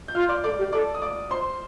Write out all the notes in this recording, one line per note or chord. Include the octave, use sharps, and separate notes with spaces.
G6
F4 F5 F6
D5 D6
A4 D5 D6
G4
A4 D5 D6
D#6
D5 D6
C5 C6